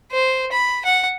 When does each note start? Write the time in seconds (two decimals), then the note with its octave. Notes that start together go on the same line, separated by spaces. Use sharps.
0.11 C5
0.52 B5
0.85 F#5